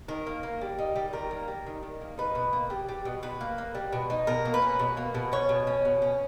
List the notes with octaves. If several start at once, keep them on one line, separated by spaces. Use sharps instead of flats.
D#3 A#4
A#3
A#3
G3
D#4
G3
D#3 A#4
A#3
G3
D#3
D#3
A#3
D#4 B4
B2
A#3
G3
G3
B2
B2 B4
A#3
A#3
G3
B2
D#4
B2 A#4
A#3
B4
C#4
B2
A#3
B2
C#4 C#5
B2
C#4
B2
C#4